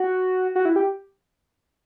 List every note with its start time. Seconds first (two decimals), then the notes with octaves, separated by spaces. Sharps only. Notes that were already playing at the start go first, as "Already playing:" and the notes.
Already playing: F#4
0.55 F#4
0.65 E4
0.76 G4